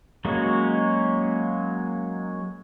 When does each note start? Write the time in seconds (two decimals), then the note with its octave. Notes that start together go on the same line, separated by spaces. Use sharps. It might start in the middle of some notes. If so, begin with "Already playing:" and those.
0.25 F#3 G#3 A#3 C#4 F#4